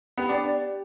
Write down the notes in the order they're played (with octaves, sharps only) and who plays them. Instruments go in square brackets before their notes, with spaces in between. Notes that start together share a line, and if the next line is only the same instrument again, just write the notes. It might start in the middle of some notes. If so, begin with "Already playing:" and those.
[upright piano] B3 [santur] G4
[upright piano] D4 [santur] D5